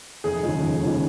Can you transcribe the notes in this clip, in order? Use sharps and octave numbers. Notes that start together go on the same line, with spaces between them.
F1 G#4
D#2 C#3 F3 G#3
F1
D#2 C#3 F3 G#3